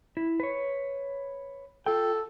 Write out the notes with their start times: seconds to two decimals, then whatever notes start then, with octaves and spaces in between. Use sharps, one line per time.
0.17 E4
0.40 B4 C#5
1.86 F4 A4 G5